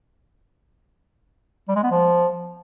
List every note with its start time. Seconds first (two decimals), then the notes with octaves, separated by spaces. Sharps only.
1.68 G3
1.76 G#3
1.83 B3
1.91 F3